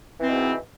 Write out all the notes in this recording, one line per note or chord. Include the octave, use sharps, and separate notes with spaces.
G#2 B2 E3 C4